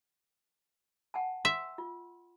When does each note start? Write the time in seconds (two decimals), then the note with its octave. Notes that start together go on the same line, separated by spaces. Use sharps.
1.14 F#5 G#5 A5
1.45 E5 C6
1.78 F4